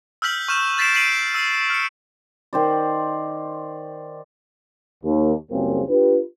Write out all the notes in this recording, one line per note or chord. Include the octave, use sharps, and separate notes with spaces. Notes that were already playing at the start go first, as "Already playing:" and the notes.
E6 F6 G6 B6 F#7
C#6 F6 G6 E7
G6 A6 B6 C7 D7 E7
G6 B6 C7 D7 D#7 F#7
E6 C7
F6 C#7
D#3 C5 D5
D#2
F#1 C#2 C#3 G3 A#3 C4
D4 F4 G4 B4